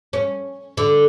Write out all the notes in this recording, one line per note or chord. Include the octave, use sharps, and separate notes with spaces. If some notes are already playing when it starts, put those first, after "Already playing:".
C#4
D3